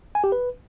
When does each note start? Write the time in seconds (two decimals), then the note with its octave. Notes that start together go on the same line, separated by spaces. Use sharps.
0.15 G#5
0.24 G4
0.32 B4